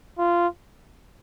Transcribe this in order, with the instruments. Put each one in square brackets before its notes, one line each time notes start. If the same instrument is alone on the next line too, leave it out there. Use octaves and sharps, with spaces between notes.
[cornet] F4